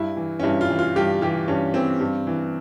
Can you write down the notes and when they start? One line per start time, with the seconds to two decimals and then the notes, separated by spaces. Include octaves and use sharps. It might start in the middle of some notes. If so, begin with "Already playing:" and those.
Already playing: G2 E4
0.17 E3
0.40 C#4
0.43 G2 E4
0.61 F4
0.69 E3
0.79 F4
0.96 G2 G4
1.21 E3 G4
1.48 G2 C#4
1.74 E3 C4
2.00 G2
2.27 E3